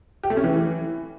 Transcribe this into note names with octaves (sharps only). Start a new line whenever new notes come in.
G4
A3
C#4
E3